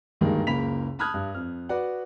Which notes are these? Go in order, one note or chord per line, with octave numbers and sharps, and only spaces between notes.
D2 G2 D#3 G3 G#3 A#3
F#1 C#2 A#3 B5 B6 F7
A5 B5 D#6 F6 F#6 G#6
G2
F2 F6
F#4 B4 D5 F#5